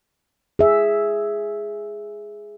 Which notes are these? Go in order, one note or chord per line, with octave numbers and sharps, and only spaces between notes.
G#4 E5